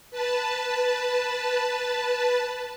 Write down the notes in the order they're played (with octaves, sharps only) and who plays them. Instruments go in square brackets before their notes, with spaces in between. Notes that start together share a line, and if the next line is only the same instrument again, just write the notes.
[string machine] B4 A5